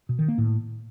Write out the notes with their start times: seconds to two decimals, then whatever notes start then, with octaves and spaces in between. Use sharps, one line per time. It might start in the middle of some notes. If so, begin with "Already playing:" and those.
0.09 B2
0.19 D#3
0.28 A#3
0.38 A2